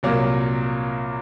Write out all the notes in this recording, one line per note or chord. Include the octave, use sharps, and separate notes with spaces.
C2 A#2 F#3 A#3